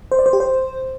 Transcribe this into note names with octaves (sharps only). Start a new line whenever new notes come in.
C5
D5
C5
G4
C5